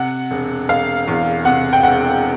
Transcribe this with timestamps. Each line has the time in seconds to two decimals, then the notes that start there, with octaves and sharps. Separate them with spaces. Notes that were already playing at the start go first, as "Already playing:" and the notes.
Already playing: C3 F#5
0.31 E1
0.68 E1 F5
1.08 E2
1.45 C3 F#5
1.73 G5
1.83 E1 F#5